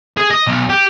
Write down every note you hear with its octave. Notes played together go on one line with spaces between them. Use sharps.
G#4
D#5
B1
G4